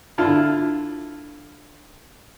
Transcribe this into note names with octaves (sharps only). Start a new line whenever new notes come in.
D3 E4 F4 A5 F6